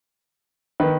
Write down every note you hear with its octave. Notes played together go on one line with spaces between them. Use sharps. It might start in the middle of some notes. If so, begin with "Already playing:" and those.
D#3 B4